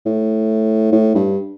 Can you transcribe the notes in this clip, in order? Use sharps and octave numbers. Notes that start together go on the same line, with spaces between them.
A2
A2
G2